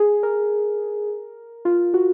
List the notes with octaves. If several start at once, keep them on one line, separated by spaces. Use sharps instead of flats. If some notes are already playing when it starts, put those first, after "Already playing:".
Already playing: G#4
A#4
F4
F#4